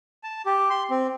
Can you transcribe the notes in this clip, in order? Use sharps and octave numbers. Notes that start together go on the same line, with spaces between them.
A5
G4
C6
C4